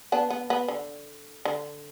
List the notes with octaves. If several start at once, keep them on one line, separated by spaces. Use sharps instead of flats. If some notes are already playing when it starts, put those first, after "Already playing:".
B3 D4
B3
B3
D3
D3